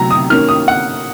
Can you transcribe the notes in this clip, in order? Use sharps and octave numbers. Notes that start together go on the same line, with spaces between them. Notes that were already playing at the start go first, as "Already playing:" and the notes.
Already playing: C3 F#3 A3 A#5
D#6
D#3 A#3 C#4 F6
D#6
F#5